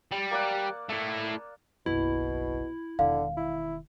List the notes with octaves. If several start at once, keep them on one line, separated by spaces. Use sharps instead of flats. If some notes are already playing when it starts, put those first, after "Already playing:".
G3
A#3 D5 F#5
A3 E4
F#1 B1 B2 E4
E1 D3 D#3 F5
E4